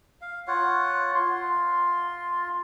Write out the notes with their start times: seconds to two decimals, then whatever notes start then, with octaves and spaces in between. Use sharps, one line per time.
0.22 F5
0.48 F4 C#5 F#5
1.15 F4 C6